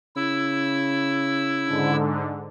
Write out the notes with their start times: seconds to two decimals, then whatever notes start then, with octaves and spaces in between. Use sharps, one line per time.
0.16 C#3 E4 E6
1.66 G#2 D3